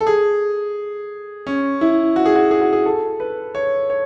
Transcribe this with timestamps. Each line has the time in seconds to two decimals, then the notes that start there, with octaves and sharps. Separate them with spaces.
0.01 A4
0.07 G#4
1.47 C#4
1.81 E4
2.16 F#4
2.25 G#4
2.36 F#4
2.51 G#4
2.61 F#4
2.73 G#4
2.86 A4
3.20 B4
3.55 C#5
3.90 C#5